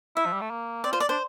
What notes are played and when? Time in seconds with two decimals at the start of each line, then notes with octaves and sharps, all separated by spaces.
0.16 E4 E5
0.26 F3
0.33 G3
0.41 A3
0.50 A#3
0.84 C4 D5
0.92 F4 C5
1.00 D5
1.09 D4 C5